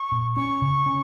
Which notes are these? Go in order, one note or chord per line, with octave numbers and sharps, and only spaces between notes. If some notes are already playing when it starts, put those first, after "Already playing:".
Already playing: C#6
A#2
C#4 C#6
C#3
C#4